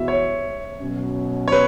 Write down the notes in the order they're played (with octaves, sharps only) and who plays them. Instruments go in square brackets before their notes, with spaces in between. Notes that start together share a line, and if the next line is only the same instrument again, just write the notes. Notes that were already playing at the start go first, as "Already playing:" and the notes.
Already playing: [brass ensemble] E2 B2 B3 F#4 [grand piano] E5
[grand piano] C#5
[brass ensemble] B2 F#3 C#4
[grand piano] C#5
B4